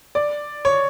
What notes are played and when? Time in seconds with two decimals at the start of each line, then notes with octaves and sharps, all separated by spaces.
0.15 D5
0.65 C#5